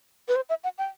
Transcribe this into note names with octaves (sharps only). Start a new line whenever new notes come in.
B4
C5
E5
F#5
G5